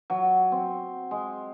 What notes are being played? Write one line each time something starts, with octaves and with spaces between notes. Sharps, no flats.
F#3
C4
G#3